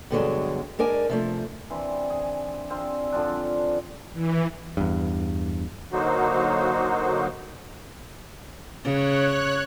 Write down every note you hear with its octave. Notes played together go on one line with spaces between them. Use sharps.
G2 B2 D3 D#3 F#3 G#3
G#3 D4 A#4 D5 G#5
C3 F3 A3
E3 C4 D4
G#4
C4 D4 F4 G#4
D3 F3 C4 D4
E3
E2 G2
D3 F#3 A#3 D#4 F#4 C5
C#3 C#5 F#6